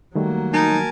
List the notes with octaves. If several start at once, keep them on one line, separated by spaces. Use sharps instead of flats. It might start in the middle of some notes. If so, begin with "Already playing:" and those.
D#3 F#3 G3 A3 A#3
D#4 A#4 G#5 A5